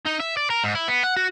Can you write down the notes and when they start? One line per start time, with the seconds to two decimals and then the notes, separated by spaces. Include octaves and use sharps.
0.05 D#4
0.20 E5
0.37 D5
0.50 A#4
0.64 G#2
0.75 E4
0.88 B3
1.04 F#5
1.17 F#4